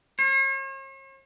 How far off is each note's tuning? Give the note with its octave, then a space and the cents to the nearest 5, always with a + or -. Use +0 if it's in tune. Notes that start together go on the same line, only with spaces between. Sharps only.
C#5 -45